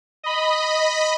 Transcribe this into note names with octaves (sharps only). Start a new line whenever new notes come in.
D#5 B5